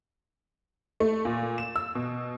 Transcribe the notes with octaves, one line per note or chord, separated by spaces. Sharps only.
A3
A#2
E7
E6
B2